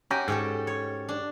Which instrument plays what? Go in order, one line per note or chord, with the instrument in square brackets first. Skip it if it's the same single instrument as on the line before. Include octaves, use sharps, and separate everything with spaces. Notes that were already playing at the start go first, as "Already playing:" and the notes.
[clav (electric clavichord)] C#4 G5 A#5 [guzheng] F#4 G4
[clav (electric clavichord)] G#2 [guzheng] C#4 G4 A4
[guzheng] C#5
D4